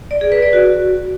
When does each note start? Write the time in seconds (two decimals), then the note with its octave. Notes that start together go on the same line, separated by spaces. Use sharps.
0.11 D5
0.21 G#4
0.32 B4
0.42 D5
0.53 F#4